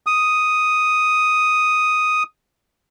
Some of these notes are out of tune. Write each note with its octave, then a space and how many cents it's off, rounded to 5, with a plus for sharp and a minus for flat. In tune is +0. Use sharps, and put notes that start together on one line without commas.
D#6 +5